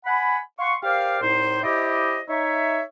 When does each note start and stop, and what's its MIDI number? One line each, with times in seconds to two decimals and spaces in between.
0.06 0.39 78
0.06 0.39 80
0.06 0.39 83
0.59 0.76 77
0.59 0.76 78
0.59 0.76 84
0.59 0.76 85
0.83 1.21 67
0.83 1.21 70
0.83 1.21 72
0.83 1.21 74
0.83 1.21 77
1.22 1.60 36
1.22 1.60 45
1.22 1.60 63
1.22 1.60 72
1.64 2.21 64
1.64 2.21 67
1.64 2.21 72
1.64 2.21 74
1.64 2.21 75
2.29 2.82 63
2.29 2.82 73
2.29 2.82 76